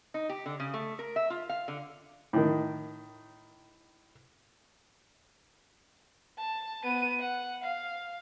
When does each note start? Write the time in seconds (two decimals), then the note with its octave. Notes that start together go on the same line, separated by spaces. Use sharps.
0.14 D#4
0.29 G4
0.46 D3
0.60 C#3
0.74 A3
0.99 A#4
1.16 E5
1.30 F4
1.49 F5
1.68 D3
2.33 A2 D#3
6.39 A5
6.84 B3 D#7
7.20 F#5
7.64 F5